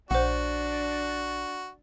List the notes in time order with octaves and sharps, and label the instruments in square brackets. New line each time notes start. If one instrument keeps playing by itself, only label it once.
[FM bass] A#1 [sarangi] D4 [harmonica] F#4 [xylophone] C5 F#5